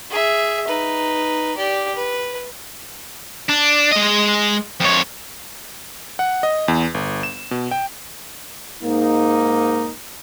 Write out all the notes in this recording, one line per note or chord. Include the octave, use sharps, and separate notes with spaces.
G#4 E5
D#4 B4
G4 D5
B4
D4
G#3 D#5
F2 C#5
F#5
D#5
E2
G1
E7
B2
G5
G#2 A#3 D#4